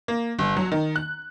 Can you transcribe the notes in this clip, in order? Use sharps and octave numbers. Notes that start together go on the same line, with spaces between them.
A#3
G1
F#3
D#3
F#6